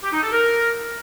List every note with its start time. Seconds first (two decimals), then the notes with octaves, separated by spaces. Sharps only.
0.03 G4
0.12 D#4
0.22 A4
0.32 A#4